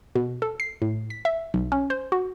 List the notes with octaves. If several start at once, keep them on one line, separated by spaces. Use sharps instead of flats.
B2
A4
C7
A2
B6
E5
B1
C#4
C5
F#4